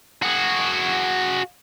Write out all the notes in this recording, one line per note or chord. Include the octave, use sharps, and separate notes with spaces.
F#4 G#4